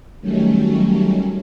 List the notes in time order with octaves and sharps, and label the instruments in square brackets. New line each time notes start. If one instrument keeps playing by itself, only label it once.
[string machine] D#3 F#3 G3 A3 C#4